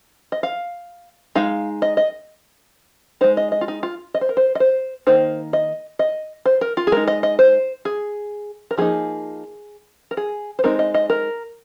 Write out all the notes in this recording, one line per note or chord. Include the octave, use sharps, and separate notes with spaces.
D#5
F5
G#3 D#4 F5
D#5
D#5
G#3 D#4 C5
D#5
D#5
F4
D#4
F4
D#5
C5
A#4
C5
D#5
C5
D#3 A#3 D#4 C5
D#5
D#5
C5
A#4
F4
G#4
G#3 D#4 A#4
D#5
D#5
C5
G#4
A#4
F3 A#3 D#4 G#4
A#4
G#4
C5
G#3 C4 D#4 A#4
D#5
D#5
A#4